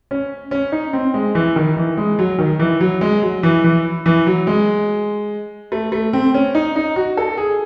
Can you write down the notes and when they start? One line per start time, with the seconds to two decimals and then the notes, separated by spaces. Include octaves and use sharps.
0.11 C#4
0.51 C#4
0.72 D#4
0.93 C4
1.14 G#3
1.35 E3
1.56 D#3
1.77 E3
1.97 G#3
2.19 F#3
2.39 D#3
2.59 E3
2.81 F#3
3.01 G#3
3.22 F#3
3.43 E3
3.64 E3
4.06 E3
4.27 F#3
4.47 G#3
5.72 A3
5.92 A3
6.13 C4
6.34 C#4
6.55 D#4
6.76 D#4
6.96 F#4
7.17 A4
7.38 G#4